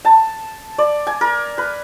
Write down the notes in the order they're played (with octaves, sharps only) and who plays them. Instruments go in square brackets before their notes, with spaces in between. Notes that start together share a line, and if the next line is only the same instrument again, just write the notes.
[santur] A5
D5
G#5
A#4
B4